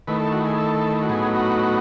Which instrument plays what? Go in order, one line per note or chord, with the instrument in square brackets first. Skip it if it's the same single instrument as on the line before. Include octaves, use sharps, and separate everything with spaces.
[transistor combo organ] D#3 A3 E4 B4
A4
F#4
G#4
A4
F#4
A2 F#3 B3 D#4 G#4
F#4